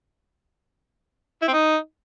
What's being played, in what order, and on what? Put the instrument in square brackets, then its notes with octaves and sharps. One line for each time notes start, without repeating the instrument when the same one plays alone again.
[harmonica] E4
C4
D#4